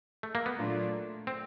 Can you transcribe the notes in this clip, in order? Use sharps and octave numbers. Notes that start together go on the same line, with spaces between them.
A3
A#3
B3
A#2 F#3 A3 D4 F4
C4